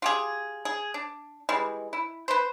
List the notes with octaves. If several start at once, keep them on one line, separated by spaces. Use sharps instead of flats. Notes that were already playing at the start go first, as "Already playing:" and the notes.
F4 G4 G#4
G#4
D4
E3 G3 G#3
E4
B4 C5